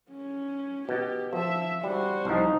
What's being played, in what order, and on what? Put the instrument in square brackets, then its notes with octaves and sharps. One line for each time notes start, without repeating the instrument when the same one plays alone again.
[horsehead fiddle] C#4
[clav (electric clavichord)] B2 [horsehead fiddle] G4
[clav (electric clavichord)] F3 [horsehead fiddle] E5
[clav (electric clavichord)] G3 [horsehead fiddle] F#4 C5
[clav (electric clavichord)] C2 F3 [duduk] D#4